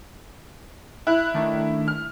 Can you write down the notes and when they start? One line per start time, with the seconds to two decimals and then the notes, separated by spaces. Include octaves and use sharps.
1.07 E4 F#6
1.34 D#3 A3 D4
1.88 F6